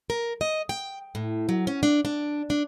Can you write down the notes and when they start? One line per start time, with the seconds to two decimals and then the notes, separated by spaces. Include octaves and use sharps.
0.10 A#4
0.41 D#5
0.69 G5
1.15 A2
1.49 F#3
1.67 C#4
1.83 D4
2.05 D4
2.50 D4